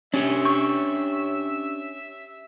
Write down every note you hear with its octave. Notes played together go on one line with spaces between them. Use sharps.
C#4 D4 G4 C#5 E5
C#6